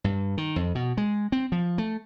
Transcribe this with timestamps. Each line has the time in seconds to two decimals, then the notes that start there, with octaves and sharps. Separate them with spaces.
0.04 G2
0.38 D#3
0.56 F2
0.75 B2
0.97 G#3
1.32 C4
1.52 F3
1.78 A3